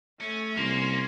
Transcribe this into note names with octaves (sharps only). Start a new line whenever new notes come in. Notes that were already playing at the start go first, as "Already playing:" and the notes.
A3 C#4
C2 A#3 C6